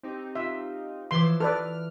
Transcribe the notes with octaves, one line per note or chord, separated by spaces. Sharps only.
C4 D#4 G4
F4 E5
E3 F3 C#5 E5 C6 D6
A4 B4 D5 F6